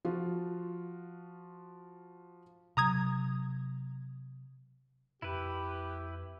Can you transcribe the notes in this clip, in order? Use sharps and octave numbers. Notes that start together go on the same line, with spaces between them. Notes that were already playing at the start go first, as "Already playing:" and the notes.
F3 F4 F#4
C3 F#3 A#5 D#6 G#6
F2 E4 G4 B4